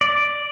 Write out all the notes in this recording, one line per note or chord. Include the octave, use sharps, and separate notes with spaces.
D5